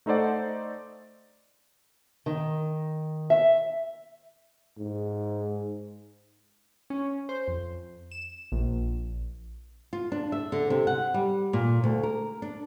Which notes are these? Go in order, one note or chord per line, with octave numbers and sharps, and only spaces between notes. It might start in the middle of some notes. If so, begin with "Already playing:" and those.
A3 D#4 A4 C5 D5 F#5
D#3
E5
G#2
C#4
C5
F2
E7
A#1
F4
D4
E5
D3
C3
F#5
G3
A#2
D2
A#4
D4